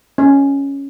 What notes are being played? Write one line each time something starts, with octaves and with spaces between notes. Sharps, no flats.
C#4